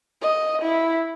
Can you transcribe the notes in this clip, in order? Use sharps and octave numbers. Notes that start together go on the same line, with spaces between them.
D#5
E4